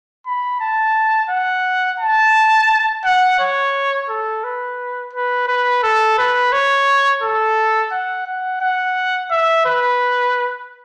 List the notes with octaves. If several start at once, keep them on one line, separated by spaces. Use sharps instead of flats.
B5
A5
F#5
A5
F#5
C#5
A4
B4
B4
B4
A4
B4
C#5
A4
F#5
F#5
F#5
E5
B4